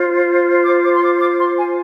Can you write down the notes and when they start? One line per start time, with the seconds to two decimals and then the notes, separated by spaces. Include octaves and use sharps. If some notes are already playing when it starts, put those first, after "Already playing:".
Already playing: F4 C5
0.64 D6
0.83 D6
0.95 C6
1.02 D6
1.20 D6
1.39 C6
1.57 G#5